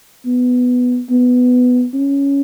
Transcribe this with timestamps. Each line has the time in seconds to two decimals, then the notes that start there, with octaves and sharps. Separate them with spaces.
0.25 B3
1.10 B3
1.93 C#4